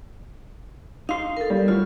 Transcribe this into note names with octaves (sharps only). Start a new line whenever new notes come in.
D#4 F5 C6
A4 A#4
G3
F#2 A2 F4